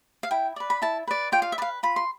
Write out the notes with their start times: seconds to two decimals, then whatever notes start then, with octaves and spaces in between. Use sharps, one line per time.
0.23 F5
0.31 E4 G5
0.56 B4 D5
0.70 B5
0.82 E4 A5
1.07 B4 D5
1.32 F4 G5
1.42 F5
1.52 E5
1.58 B4 D5
1.62 F5
1.83 F4 B5
1.96 C6